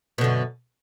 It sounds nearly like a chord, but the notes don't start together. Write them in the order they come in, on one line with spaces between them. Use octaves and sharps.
B2 D3 F#2